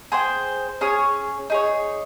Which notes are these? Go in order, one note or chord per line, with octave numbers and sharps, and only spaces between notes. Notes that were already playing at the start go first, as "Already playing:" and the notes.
G#4 C5 G5
C#4 G#4 C#5
D#4 G#4 C#5